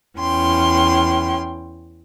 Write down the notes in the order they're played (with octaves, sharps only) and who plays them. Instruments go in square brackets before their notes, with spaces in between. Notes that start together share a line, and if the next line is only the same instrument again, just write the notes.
[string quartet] E2 C#4 G5 C6